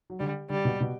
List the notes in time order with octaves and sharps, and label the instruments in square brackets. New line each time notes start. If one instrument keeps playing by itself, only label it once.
[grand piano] F#3
[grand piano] D3 [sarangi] G3
[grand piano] D3 [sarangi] G3
[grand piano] B2
B2